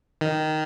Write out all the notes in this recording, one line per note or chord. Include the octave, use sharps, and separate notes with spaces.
D#3